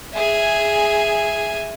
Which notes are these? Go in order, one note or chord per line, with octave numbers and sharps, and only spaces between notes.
G#4 E5 G#5